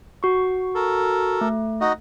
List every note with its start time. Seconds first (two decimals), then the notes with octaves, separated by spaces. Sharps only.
0.23 F#4 C#6
0.75 A4 A#4
1.41 A3
1.81 D#4 F#4 D#5